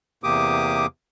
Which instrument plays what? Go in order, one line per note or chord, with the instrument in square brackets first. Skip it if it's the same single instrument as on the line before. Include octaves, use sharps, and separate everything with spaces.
[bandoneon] E2 C3 A#3 G4 D6 D#6